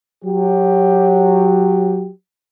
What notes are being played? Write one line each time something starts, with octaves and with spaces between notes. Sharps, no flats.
F#3 G4